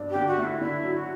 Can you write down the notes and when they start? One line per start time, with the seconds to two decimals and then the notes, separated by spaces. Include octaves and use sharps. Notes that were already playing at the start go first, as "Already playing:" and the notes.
Already playing: G2 D4
0.10 D3 G4
0.27 F#4
0.38 A3
0.44 E4
0.61 D3 E4
0.83 F#3
0.95 F#4